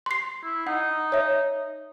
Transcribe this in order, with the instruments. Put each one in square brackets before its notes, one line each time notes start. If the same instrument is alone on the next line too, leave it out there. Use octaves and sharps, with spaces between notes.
[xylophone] C6 C7
[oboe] E4
[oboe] D#4 [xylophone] F#5
[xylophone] C#5 E5